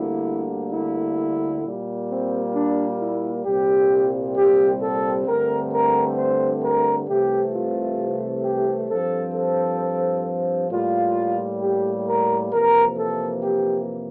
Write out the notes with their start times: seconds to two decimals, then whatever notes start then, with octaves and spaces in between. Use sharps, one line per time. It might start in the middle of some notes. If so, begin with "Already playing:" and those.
Already playing: D2 D3 G3 A#3 E4
0.72 E4
1.63 A#2 G3 A#3
2.08 C4
2.54 D4
2.99 E4
3.45 C2 A#2 G3 C4 G4
4.35 G4
4.80 A4
5.25 G2 D3 A3 C4 A#4
5.72 A#4
6.17 C5
6.63 A#4
7.07 C2 C3 E3 A3 G4
7.53 F4
8.43 G4
8.88 G2 F3 C4 A4
9.33 A4
10.69 A2 G3 A#3 F4
11.61 G4
12.06 A#4
12.51 F2 C3 E3 A#3 A#4
12.97 A4
13.43 G4